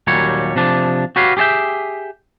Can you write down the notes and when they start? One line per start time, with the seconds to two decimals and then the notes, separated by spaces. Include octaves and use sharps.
0.07 D#2 A#2 F#3 G3 C#5
0.56 C3 F3 D4
1.16 F#4 G4 B4 C#5 F5
1.37 G4 G#4 C#5 E5 G5